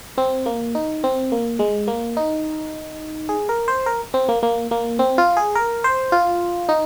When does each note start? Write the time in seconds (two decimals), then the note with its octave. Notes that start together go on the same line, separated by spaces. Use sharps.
0.18 C4
0.46 A#3
0.75 D#4
1.04 C4
1.32 A#3
1.59 G#3
1.88 A#3
2.17 D#4
3.29 G#4
3.49 A#4
3.68 C5
3.86 A#4
4.14 C4
4.29 A#3
4.43 A#3
4.71 A#3
4.99 C4
5.18 F4
5.37 G#4
5.55 A#4
5.84 C5
6.12 F4
6.69 D#4